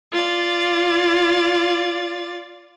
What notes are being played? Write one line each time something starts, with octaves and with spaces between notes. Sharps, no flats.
F4 D5 A6